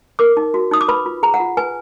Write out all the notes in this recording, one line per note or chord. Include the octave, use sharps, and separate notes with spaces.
A#4 D6
D#4
F#4
D#4 D#6
D6
B4 B5
F4
G#4 A#5
F#5
F4
B4 G#5